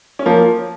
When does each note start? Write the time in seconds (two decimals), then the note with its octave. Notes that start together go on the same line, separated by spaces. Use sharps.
0.19 C#4
0.26 F3 A#3